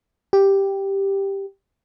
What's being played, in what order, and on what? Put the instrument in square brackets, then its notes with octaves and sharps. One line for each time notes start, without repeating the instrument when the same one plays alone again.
[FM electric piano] G4